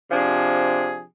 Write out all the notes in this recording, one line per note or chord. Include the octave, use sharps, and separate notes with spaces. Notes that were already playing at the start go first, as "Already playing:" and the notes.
C3 F3 D4 G#4